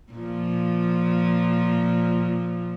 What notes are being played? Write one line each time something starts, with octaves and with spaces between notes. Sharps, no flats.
A#2 F3